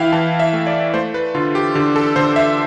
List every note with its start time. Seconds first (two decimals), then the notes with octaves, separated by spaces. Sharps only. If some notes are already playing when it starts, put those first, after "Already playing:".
Already playing: E3 E4 E5 F5 G5
0.12 E3 A5
0.40 E5
0.53 A3
0.67 D5
0.94 A3 C5
1.14 B4
1.35 D3 F4
1.55 G4
1.75 D3 G4
1.96 A4
2.16 D3 C5
2.36 E5